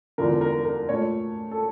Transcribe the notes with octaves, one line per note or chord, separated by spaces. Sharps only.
E2 D3 F3 A#4
A#4
A#4
A#2 A3 C#5
A4